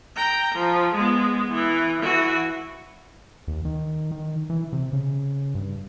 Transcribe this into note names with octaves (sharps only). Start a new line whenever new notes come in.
G5 A#5
F3
G#3 B3
E3
E3 F#4
D#2
D#3
D#3
E3
C3
C#3
G2